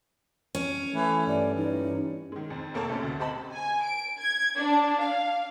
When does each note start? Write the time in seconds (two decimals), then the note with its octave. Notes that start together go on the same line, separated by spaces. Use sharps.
0.55 C#4
0.95 E3 A3
1.27 G2 D5
1.56 E3 D#4
2.32 D#3 G#3
2.50 F2
2.74 F1 A#3 A4 C#5 A5
2.89 A1 F#2 A3
3.03 D2
3.19 C4 G4 D#5 A5 B5
3.52 G#5
3.83 D7
4.19 G#6
4.56 D4
5.00 F5